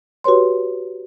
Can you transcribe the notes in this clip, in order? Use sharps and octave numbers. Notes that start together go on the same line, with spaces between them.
F#4 G4 B4 C#5 C6